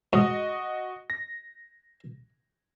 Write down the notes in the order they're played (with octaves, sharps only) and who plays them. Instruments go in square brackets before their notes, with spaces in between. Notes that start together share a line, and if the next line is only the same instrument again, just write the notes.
[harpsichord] G#2 [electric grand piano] F#4 D#5 D#6
[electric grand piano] A#6